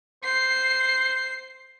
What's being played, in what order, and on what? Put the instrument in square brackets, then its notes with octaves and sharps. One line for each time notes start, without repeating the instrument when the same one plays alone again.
[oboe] C5 [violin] C7